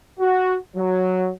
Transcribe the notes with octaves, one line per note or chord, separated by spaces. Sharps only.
F#4
F#3